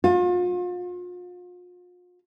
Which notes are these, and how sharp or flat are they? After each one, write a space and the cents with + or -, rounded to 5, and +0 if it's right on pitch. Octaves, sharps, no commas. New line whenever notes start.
F4 +40